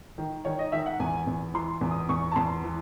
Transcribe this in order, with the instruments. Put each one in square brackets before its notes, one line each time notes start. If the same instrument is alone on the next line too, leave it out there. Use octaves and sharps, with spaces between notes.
[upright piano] D#3
D#3 C#5
D#5
D#3 E5
F#5
E2 G#5
E2
E3 C6
E2
D#6
E2 C#6
A5
E2 C6
E3